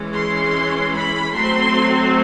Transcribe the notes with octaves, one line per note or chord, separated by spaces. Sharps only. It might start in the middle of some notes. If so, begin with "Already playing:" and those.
Already playing: E3 G#3 C#4
C6
B5
F#3 A3 C4 C6